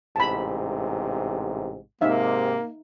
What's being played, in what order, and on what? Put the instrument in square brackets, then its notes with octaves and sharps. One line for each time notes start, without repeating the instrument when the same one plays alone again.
[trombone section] A1 G#2 C3 [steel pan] A5 B5
[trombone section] G#2 C3 [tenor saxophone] A#3 [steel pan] D#4 E5 F5